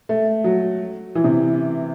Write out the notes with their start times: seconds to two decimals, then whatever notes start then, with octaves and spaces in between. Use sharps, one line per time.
0.09 A3
0.44 F#3
1.15 E3
1.24 C3